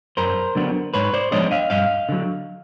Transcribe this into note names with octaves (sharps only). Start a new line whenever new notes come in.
F#2 A#4 C5
D3 F#3 B3 D4
G#2 B4 C#5
C5 D5
F3 G#3 B3 D4 C#5 D#5
D#5 F5
G2 D#5 F5
D3 F#3